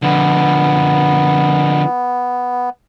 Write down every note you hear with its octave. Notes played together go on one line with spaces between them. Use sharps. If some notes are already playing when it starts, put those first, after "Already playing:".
D3 F3 B3